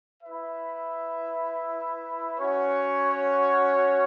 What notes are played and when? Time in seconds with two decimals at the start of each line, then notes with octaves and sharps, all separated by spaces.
0.22 E4 B4 E5
2.38 C#4 F#4 C#5 F#5